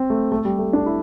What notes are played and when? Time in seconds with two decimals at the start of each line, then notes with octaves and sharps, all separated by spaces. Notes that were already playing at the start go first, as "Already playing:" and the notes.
Already playing: C4
0.10 A3
0.32 A3
0.45 G3
0.59 A3
0.73 D4
0.86 E4